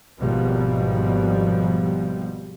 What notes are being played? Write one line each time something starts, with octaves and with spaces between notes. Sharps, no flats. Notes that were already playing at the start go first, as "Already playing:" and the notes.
G#1 B2 F3 G3